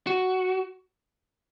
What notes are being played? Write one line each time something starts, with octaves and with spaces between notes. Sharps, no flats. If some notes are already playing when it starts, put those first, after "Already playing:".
F#4